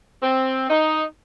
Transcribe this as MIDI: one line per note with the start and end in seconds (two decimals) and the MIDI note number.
0.23 0.67 60
0.70 1.04 63